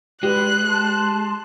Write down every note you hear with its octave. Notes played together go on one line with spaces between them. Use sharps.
G#3 G4 B4 D5 F#6
A5 C6